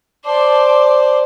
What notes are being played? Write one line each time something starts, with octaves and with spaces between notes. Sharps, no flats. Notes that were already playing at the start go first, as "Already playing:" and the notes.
C5 D5 A5 D6